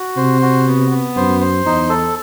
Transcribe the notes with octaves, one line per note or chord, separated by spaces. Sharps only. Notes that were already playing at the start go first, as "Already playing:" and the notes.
Already playing: F#4
C3 C5
F#4
B3
B3
F#2 C5
C5
E2 D#4
A4